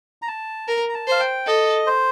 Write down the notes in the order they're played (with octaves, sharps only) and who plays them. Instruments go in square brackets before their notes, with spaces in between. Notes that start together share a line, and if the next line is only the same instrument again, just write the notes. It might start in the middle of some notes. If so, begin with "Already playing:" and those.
[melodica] A#5
A5
[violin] A#4 [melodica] A#5
[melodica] A#5
A5
[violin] C5 [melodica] F5
[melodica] G5
[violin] A4 [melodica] D#5
[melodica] C5